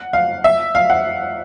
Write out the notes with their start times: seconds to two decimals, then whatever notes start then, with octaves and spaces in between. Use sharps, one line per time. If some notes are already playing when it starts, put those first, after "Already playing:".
Already playing: F#5
0.13 F5
0.44 E5
0.75 F5
0.90 F#5